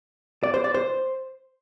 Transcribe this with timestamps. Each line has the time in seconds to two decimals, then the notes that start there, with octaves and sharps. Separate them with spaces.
0.43 D5
0.54 C5
0.64 D5
0.74 C5